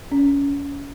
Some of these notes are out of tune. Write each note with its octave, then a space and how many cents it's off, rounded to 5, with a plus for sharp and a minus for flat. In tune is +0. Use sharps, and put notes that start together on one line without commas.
C#4 +25